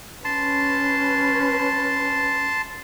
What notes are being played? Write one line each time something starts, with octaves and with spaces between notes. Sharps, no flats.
C#4 B4 A5 C6